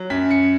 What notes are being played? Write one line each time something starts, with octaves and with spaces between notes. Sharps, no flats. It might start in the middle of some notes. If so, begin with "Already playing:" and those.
Already playing: F#3
F#2 B6
C#7